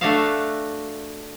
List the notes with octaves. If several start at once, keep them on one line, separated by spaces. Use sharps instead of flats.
A3 D4 F#4 A4 E5 F5